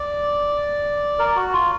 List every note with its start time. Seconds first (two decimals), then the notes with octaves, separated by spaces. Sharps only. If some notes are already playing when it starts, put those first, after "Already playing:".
Already playing: D5
1.19 A#4
1.35 F#4
1.53 F4